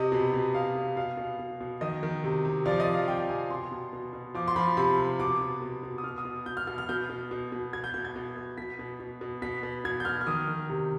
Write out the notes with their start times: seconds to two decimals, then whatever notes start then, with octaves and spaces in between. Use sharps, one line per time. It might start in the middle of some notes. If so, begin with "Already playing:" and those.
Already playing: C3 D#5
0.12 B2
0.33 B2
0.55 B2 F5
0.76 B2
0.96 B2 F5
1.17 B2
1.39 B2
1.61 B2
1.81 D#3 D#5
2.03 D#3
2.24 C3
2.45 C3
2.66 F3 D5
2.80 D#5
2.87 F3
2.94 F5
3.08 C3 G5
3.18 G5
3.29 C3 G#5
3.50 B2 C6
3.72 B2
3.93 B2
4.13 B2
4.35 F3 D6
4.48 C6
4.56 F3 B5
4.77 C3 B5
4.99 C3
5.19 B2 D6
5.41 B2
5.62 B2
5.83 B2
5.98 D#6
6.04 B2 F6
6.18 D#6
6.25 B2
6.46 B2 G6
6.57 F6
6.67 B2 F6
6.78 F6
6.89 B2 G6
7.10 B2
7.31 B2
7.52 B2
7.73 B2 G#6
7.84 G6
7.94 B2 G6
8.05 G#6
8.16 B2
8.37 B2
8.58 B2 B6
8.79 B2
9.00 B2
9.21 B2
9.42 B2 B6
9.63 B2
9.85 B2 G#6
10.00 G6
10.05 B2 F6
10.21 F6
10.27 D#3 D#6
10.48 D#3
10.69 C3